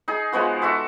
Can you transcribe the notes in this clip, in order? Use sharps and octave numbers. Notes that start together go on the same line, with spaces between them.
D#4 G#4
F3 G#3 B3 F#4
F#4 A4 E5 F#5